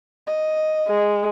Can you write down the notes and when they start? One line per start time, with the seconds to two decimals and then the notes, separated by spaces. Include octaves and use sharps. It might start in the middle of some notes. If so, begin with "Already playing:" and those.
0.27 D#5
0.88 G#3